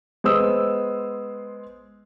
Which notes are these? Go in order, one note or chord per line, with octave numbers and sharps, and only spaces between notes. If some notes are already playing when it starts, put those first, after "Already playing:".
G#3 B3 C5 D#6 E6